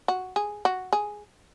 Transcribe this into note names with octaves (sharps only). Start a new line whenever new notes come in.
F#4
G#4
F#4
G#4